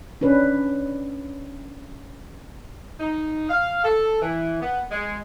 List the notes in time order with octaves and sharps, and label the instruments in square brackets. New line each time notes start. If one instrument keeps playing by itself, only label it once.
[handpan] C#4 D4 B4
[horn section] D#4
F5
A4
E3
B3
G#3